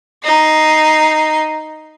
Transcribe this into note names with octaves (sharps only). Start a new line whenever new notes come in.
D#4 C7